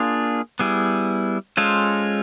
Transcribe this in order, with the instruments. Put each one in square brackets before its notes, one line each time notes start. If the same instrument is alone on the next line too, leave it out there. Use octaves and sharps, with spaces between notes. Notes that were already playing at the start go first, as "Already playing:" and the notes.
Already playing: [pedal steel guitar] A#3 D4 F4 G#4
G3 B3 E4 G#4
G#3 C#4 F4 A4 C5